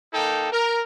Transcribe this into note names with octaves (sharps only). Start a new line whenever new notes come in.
A#3 D#4 A4 G5
A#4